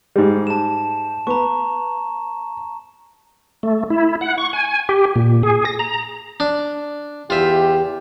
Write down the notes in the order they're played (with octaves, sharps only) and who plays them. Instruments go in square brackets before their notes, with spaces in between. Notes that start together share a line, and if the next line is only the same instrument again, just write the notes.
[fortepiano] G#2 G3
[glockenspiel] A5 E7
[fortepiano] B3 [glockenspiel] A#5 C#6
[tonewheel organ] A3
E4
F#5
C#6
G#5
G4
A#2
G#4
A#6
A#5
[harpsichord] D4
[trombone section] E2 G4 [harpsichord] F4 E5